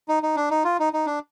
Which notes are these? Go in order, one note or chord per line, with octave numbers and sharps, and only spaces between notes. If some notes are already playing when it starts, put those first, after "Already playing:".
D#4
D#4
D4
D#4
F4
D#4
D#4
D4